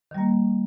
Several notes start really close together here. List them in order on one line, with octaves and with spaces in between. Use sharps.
D#3 G3 A#3